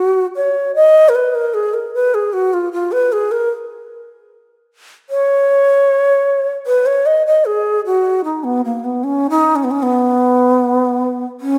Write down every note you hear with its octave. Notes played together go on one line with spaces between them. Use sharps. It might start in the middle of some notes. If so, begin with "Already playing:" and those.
Already playing: F#4
C#5
D#5
A#4
B4
A#4
G#4
A#4
B4
G#4
F#4
F4
F4
B4
G#4
A#4
C#5
B4
C#5
D#5
D#5
G#4
F#4
D#4
B3
A#3
B3
C#4
D#4
C#4
B3
C#4
B3
C#4